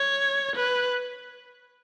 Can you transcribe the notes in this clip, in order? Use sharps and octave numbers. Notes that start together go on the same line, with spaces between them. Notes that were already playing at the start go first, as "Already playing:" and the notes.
Already playing: C#5
B4